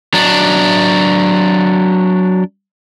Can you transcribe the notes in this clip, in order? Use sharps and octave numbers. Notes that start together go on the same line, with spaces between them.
F#3 D4